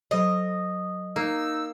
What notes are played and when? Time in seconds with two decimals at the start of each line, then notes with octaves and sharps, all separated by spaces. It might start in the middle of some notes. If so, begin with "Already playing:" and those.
0.11 F#3 A4 C5 D#5
1.16 A#3 D#4 E6